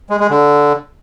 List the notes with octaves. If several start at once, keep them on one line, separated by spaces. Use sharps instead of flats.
G#3
G#3
D3